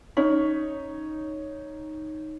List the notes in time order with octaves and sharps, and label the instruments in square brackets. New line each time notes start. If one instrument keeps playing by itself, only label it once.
[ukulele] C#4 [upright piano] D#4 C#5